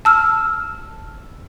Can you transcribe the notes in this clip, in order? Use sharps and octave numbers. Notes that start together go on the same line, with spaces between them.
A5 E6 F6